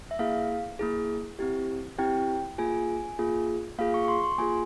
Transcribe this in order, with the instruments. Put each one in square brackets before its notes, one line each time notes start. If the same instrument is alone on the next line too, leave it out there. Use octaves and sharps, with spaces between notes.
[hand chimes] E5
A#3 E4 G#4 F5
A#3 E4 G#4
C4 E4 G4
C4 E4 G4 G5
A#3 F4 G#4 G#5
A#3 F4 G#4
A#3 F4 G#4 F5
C#6
C#6
C6
C6
A#3 F4 G#4 G#5